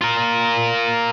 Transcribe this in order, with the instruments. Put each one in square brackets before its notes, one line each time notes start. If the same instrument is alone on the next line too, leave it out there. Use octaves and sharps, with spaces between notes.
[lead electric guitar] F4 A#4